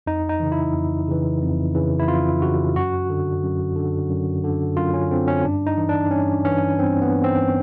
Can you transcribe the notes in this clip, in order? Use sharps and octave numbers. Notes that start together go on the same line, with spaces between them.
F2 D#4
D#4
C#3 E3
E4
F2
C#3 E3
F2
C#3 E3
E4
F2 F4
C#3 E3 F#4
F#2 F#4
D3
F#2
D3
F#2
D3
F#2 F4
C#4
D3 C4
C#4
G2 D4
D#4
E3
D4
G2 C#4
E3 C#4
G2 C4
B3
E3
C4